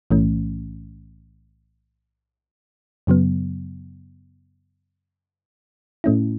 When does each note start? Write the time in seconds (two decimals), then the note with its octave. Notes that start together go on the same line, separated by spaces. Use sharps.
0.11 B1 A2 E3 A3 C#4
3.07 F#2 C#3 F#3 B3
6.04 A2 A3 C#4 E4